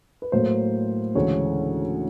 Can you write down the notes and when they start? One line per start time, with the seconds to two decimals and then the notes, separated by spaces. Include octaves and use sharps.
0.22 B4
0.32 A2 F#3 A#3 C5
1.15 D2 C#3 E3 G#3 C#5